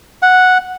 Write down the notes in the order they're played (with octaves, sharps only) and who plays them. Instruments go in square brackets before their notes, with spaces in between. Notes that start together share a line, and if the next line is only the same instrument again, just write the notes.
[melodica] F#5